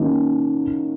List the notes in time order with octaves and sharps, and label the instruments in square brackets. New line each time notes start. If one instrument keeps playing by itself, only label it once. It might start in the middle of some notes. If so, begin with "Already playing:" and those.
Already playing: [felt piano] D#3 A#3 C#4 F#4